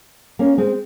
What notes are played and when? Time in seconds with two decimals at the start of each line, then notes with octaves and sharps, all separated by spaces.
0.39 A#3 C#4
0.58 G#3 C4